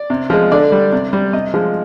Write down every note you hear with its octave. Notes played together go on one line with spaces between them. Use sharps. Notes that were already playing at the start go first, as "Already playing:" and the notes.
Already playing: D5
C3
F3 G#3
D3 D5
G3
C3
G3
C3 D#5
F3 G#3